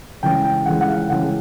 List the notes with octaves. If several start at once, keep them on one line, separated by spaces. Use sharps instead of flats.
C#3 E3 G#3 G5
G5
C#3 E3 G#3 F#5
F#5
F5
C#3 E3 G#3 F#5